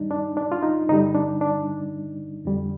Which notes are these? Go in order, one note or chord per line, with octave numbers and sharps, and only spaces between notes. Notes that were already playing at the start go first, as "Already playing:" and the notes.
Already playing: G2 D#3 G3 D4 D#4
D4
D4
F4
D#4
G2 D3 G3 D#4
D4
D4
F2 D3 G3